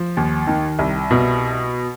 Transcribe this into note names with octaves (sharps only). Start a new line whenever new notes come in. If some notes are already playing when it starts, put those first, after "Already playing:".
Already playing: F3
D#2
D#3
C2
B2